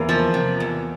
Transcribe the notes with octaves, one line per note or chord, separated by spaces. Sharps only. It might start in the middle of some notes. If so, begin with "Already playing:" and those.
Already playing: E2 A#3
F3
C3
E2